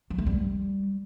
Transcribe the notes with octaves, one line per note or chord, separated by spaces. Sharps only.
F#3
A3
G3